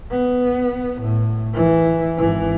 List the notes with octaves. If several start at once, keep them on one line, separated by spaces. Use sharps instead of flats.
B3
A2
E3
G#1 E3